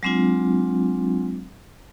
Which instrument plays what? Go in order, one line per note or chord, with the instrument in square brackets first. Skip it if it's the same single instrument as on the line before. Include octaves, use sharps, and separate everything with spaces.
[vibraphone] F#3 G#3 C4 D4 F4